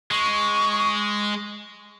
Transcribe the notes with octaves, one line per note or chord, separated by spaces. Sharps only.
G#3 C#6